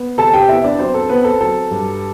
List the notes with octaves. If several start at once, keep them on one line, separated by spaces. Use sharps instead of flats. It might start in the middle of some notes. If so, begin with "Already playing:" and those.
Already playing: B3
C3 A4 A5
G4 G5
B3 E4 E5
D4 D5
F#3 C4 C5
A4
B3 C4 B4
A4
F#3 A4
G2